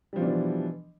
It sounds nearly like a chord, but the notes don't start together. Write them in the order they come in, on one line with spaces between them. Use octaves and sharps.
G3 F3 B2 D4 E3